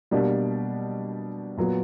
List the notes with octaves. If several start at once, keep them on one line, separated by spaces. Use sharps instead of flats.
B2 G3 A#3 D4 G4
A#2 F#3 B3